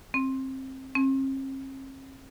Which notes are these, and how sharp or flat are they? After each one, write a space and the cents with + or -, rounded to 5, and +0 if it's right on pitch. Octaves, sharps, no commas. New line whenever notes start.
C4 +20
C4 +45